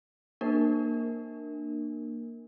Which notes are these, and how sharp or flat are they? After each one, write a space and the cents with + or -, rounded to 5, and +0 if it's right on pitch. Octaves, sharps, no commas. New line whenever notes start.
A#3 +0 D4 +30 A#4 +0